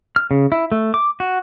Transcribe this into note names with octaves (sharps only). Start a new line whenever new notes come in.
F6
C#3
E4
A3
D6
F#4